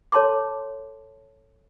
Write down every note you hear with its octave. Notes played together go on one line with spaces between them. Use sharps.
A4 C#5 A5 C6 D6